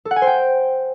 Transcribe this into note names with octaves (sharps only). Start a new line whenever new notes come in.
A4
F#5
G#5
C5
G5